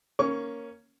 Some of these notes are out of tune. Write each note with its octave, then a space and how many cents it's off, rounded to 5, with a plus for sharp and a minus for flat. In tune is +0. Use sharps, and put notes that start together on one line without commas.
A#3 +0 C#4 +0 C#6 +25